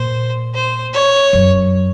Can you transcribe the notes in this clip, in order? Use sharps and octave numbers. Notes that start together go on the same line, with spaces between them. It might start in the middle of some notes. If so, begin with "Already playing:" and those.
Already playing: A#2 C5
C5
C#5
F#2